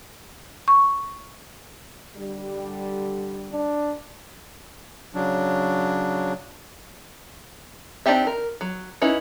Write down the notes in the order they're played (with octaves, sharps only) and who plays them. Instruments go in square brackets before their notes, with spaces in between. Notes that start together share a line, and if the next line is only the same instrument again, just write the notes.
[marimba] C#6
[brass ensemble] D3 G3
[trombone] D4
[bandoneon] C#3 F#3 D4
[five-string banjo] C4 D4 D#4 G4 E5
A#4
F#3
C#4 D#4 E4 B4